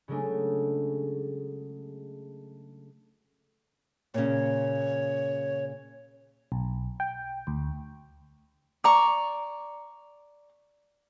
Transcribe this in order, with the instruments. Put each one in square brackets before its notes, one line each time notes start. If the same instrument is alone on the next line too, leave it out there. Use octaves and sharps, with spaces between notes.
[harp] C#3 F#3 G#3 A3 D4
[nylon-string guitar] A#2 C#3 [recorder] C#5
[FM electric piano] B1
G5
D2
[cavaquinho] D5 A#5 C#6